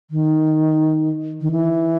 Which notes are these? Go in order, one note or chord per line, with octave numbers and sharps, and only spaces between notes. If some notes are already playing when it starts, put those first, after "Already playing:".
D#3
D#3
E3